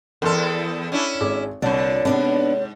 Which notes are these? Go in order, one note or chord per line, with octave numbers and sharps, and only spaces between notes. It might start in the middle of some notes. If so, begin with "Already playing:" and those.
E2 A4 A#4 C6 F6
C#4 D4 E4
G#1 G#3 D6
C2 A#2 D3 C#5 D5 A5
G#2 C3 B3 D4 D5